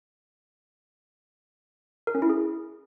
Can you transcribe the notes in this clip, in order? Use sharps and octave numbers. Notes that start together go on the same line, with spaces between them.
A#4
C#4
E4
G#4